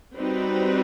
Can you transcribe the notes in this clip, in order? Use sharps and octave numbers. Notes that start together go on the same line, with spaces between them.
G3 C4 D#4 F#4 B4